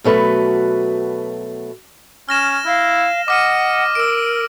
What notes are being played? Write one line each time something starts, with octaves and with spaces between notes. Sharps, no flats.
B2 F#3 A3 B4
C#4 F6 A#6 E7
E4 F5
D#5 F#5 D6 F6 D#7
A#4 E6 D7